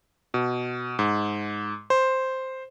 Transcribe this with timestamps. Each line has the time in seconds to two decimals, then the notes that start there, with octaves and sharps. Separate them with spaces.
0.34 B2
0.99 G#2
1.90 C5